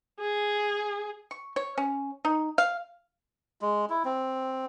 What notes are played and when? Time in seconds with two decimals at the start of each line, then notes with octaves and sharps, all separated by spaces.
0.21 G#4
1.31 C#6
1.56 C#5
1.78 C#4
2.25 D#4
2.58 F5
3.61 G#3
3.90 E4
4.05 C4